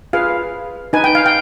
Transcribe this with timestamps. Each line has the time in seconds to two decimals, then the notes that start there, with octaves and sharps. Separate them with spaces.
0.13 F4 G#4 B4 F5
0.93 D#4 B4 G#5
1.04 G5
1.15 F5
1.26 G5